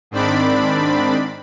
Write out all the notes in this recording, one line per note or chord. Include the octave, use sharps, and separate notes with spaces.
G#2 D#3 C4 D4 D5 B5